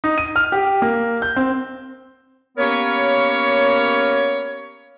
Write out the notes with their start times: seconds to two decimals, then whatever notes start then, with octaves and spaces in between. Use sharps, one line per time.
0.04 D#4
0.18 D#7
0.36 F6
0.52 G4
0.82 A#3
1.22 G6
1.36 C4
2.58 A#3 B3 C#4 G4 A#4 C#5